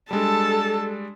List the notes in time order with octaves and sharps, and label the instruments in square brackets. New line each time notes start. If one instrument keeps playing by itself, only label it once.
[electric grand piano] G3 G#3 D4 [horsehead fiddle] A4 A5